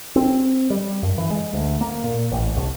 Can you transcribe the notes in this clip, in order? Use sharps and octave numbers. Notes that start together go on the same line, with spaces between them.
C4
G3
F#2
E3
G#3
D2
A#3
A#2
A1
C2